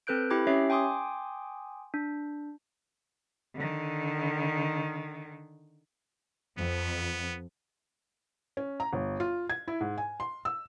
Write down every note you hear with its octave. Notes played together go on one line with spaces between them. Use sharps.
C4 A4 B4 F#6 G6 D7
E4 G4 G5 B5 D6 G#6
C#4 G4 C#5 E5 C7
G5 G#5 C6 D6 D#6
D4
D3 D#3
F2 B3
C#4
A#5
G1
F4
G#6
E4
G#2
G#5
C6
E6